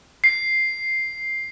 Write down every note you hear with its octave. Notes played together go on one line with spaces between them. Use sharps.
C7